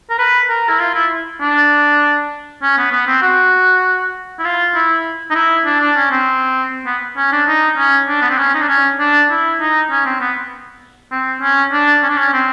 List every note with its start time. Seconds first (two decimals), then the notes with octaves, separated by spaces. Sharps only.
0.10 A#4
0.18 B4
0.49 A#4
0.69 E4
0.79 F4
0.94 E4
1.41 D4
2.62 C#4
2.77 B3
2.92 B3
3.07 C4
3.22 F#4
4.39 E4
4.44 F4
4.74 E4
5.30 D#4
5.35 E4
5.65 D4
5.80 D4
5.96 C#4
6.11 C4
6.86 B3
7.16 C#4
7.32 D4
7.47 D#4
7.77 C#4
8.08 D4
8.21 B3
8.30 C4
8.38 C#4
8.54 D#4
8.61 D4
8.68 C#4
8.99 D4
9.30 E4
9.60 D#4
9.90 C#4
10.05 C4
10.20 B3
11.11 C4
11.41 C#4
11.72 D4
12.02 C#4
12.09 D4
12.17 C#4
12.33 C4